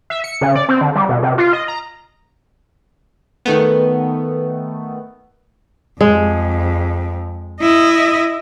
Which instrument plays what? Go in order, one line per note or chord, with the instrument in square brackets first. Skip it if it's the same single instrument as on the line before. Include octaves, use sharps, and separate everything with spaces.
[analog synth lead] E5
C#7
C#3
D5
C4
D3
G3
B2
C3
F4
D#5
A#5
[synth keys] D#3 A3 B3
[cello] F2 [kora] G#3
[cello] E4 D#5